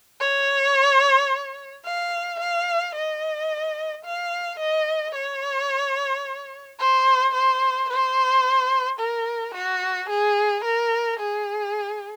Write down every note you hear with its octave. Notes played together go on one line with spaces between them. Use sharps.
C#5
F5
F5
D#5
F5
D#5
C#5
C5
C5
C5
A#4
F#4
G#4
A#4
G#4